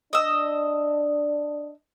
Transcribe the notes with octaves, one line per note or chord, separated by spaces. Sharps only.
D4 D#5 E6